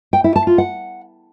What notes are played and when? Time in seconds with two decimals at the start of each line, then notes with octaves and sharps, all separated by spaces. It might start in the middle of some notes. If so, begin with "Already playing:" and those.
0.13 G5
0.24 E4
0.36 A5
0.47 F4
0.58 F#5